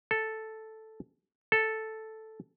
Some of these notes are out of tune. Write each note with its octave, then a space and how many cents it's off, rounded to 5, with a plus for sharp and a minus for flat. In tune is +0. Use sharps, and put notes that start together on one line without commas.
A4 +0
A4 +0